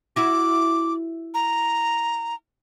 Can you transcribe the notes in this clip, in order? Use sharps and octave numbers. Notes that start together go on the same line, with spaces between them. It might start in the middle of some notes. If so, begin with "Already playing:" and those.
E4 F#4 D6
A#5